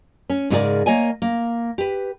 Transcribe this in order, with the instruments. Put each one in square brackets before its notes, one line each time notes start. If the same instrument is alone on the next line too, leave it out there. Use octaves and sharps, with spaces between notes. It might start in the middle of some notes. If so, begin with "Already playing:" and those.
[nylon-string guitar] C#4
G#2 C#3 D#4 G#4 A#4 D5
A#3 C#5 D#5 G#5
A#3
G4 B4